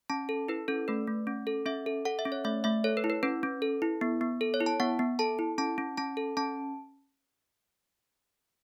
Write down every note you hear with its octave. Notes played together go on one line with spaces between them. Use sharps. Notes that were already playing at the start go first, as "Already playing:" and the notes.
C#4 A5
A4
E4 B4
C#4 A4
A3 B4
A3
C#4
A4
C#4 E5
A4
A4 F#5
E5
C#4
C#5
A3 E5
A3 E5
A4 C#5
B4
E4
B4
C#4 B4
C#4
A4
E4
B3
B3
A4
C#5
E4
A5
B3 F#5
B3
A4 A5
E4
C#4 A5
C#4
C#4 A5
A4
C#4 A5